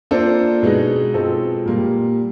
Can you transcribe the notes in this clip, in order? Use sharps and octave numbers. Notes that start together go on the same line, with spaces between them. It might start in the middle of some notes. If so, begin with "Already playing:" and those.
A#3 D4 F4 A4 C5
B2 G#3 B3 D#4 G#4
B2 G#3 C4 F4 A4
A#2 G3 A#3